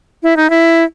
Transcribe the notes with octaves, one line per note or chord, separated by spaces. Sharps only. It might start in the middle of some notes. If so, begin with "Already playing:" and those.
E4
D#4
E4